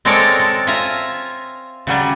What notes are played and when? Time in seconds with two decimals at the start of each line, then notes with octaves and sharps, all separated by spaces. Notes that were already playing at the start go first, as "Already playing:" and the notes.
0.05 G#3 C4 A4 A#4 C#5 D5
0.40 A4
0.67 F4 E5 G#5 A#5
1.87 C#3 F#3 G3 G#5